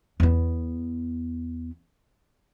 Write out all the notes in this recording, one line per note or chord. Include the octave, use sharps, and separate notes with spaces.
E2 B3